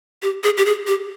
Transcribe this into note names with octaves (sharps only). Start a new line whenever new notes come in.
G4
G#4
G4
G#4
G4